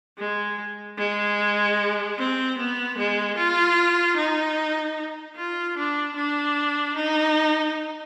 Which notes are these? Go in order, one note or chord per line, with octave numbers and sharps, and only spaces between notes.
G#3
G#3
C4
B3
G#3
F4
D#4
F4
D4
D4
D#4